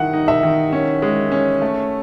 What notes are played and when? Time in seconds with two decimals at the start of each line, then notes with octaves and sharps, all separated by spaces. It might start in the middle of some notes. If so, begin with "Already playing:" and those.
Already playing: D#3 E4 F#5
0.13 D#4
0.28 E5
0.43 D#3
0.73 C#4
1.02 G#3
1.32 C#4
1.62 A3